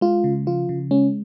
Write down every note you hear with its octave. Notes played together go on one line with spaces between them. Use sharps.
G#3 F4
C#3
F3 F4
C#3
G#3 C#4